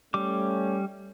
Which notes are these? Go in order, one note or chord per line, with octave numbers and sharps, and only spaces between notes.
G3 A3 C#4 D6